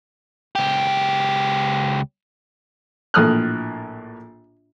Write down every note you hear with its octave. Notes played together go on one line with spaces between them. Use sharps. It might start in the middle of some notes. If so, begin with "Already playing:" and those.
C#2 G4
A#1 A2 D#6 F6 F#6